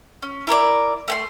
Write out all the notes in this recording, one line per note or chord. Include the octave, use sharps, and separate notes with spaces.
C#4
E4 A#4 C#5 D5
A3 G5 C6